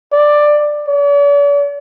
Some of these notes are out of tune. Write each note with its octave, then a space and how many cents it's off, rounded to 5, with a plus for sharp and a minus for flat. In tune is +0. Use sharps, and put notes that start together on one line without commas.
D5 +10
D5 -45